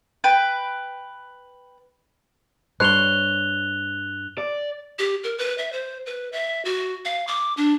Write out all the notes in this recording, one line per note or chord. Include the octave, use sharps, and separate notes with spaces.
B4 G5
G2 C5 C#5 F#6 F7 G7
D5
G4
A#4
B4
E5
C5
B4
E5
F#4
F5
D6
D4